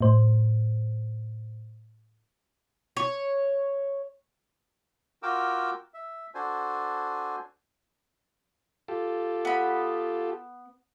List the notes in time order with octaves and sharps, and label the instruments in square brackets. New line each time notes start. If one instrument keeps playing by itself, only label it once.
[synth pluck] A2 C5
[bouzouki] C#5
[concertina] F4 F#4 A#4 G5 D6 E6
E5
D4 F#4 A4 C5 G#5
[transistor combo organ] F4 G4 A4
[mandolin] B3 B5